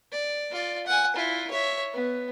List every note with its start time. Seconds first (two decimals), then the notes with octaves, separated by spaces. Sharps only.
0.12 D5
0.52 F4 D5
0.87 F#5 G#5
1.16 E4 F4
1.51 C#5 E5
1.94 B3